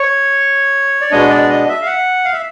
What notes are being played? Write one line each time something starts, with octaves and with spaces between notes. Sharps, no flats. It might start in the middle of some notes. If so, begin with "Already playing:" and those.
Already playing: C#5
D5
B2 G#3 B3 D4 D#5
D5
D#5
E5
F5
F#5
F5
E5